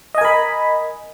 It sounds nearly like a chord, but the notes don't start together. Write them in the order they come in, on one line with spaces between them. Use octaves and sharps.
D#5 G#5 A#4 B5